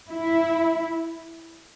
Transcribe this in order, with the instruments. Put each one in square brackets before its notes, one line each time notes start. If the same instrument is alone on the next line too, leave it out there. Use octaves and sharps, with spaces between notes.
[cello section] E4